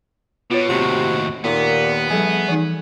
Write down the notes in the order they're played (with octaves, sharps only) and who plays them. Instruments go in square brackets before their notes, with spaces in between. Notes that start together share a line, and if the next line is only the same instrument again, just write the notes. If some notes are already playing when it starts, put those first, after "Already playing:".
[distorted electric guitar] B2 [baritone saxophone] B3 [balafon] F4 C#5
[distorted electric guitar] D#2 A2 [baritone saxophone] C3 [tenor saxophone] F#4
[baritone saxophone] D#2 [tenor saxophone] A#2 [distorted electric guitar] B3
[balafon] F3 G3 [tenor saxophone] A3 [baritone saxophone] G#4
[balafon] E3 D#4